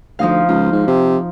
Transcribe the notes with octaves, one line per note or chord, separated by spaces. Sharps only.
D2 F3 D#4 F5
C#2 F4
G#2
C3